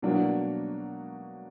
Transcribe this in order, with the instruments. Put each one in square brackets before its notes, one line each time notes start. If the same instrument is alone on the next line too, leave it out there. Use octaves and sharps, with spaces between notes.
[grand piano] B2 F#3 A#3 D4 F#4